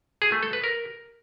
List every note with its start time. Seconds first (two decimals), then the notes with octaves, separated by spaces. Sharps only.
0.22 G#4
0.32 A3
0.43 A4
0.53 B4
0.64 A#4